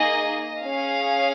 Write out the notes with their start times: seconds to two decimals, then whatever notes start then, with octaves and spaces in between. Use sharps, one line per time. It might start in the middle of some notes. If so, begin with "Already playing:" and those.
Already playing: A#3 D#4 G#4 D#5
0.63 C#4 G#4 F5